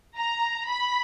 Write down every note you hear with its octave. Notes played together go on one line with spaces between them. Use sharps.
A#5
B5